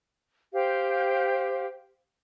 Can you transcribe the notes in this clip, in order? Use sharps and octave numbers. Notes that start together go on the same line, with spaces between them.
G4 C5 F5 G5